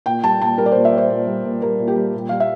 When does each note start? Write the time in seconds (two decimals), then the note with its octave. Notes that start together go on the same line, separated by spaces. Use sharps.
0.06 A#2 G5
0.23 G3 A5
0.41 A#2 A5
0.58 G3 A#4
0.66 D5
0.72 A#2 C5
0.85 E5
0.92 G3
0.98 C5
1.10 A#2
1.27 G3
1.45 A#2
1.62 G3 A#4
1.79 A#2
1.88 G4
1.96 G3
2.14 A#2
2.29 G3 F5
2.40 E5